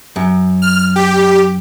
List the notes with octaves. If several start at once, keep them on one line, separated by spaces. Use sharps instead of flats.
F#2
F6
G4